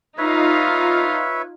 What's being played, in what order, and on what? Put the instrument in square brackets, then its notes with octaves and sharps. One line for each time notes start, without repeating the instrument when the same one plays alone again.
[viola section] D#4 F4 F5 [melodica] B4 C#5 E5